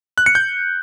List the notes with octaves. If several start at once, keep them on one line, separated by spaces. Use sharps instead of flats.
F#6
C#7
G6